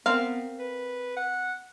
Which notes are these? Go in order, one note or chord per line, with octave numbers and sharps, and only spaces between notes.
B3 C4 A#4 F5
B4
F#5